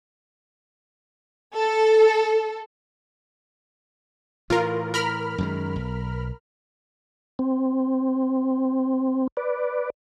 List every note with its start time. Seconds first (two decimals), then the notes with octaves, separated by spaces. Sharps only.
1.55 A4
4.50 A2 E3 F4 A#4
4.94 A#4 B5 F6
5.38 F#2 D#3 G#3
5.76 B1
7.39 C4
9.37 B4 D5